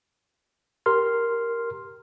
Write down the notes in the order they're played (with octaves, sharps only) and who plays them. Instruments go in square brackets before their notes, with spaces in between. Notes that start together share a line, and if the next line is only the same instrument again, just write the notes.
[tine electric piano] G4 A#4 C6 F6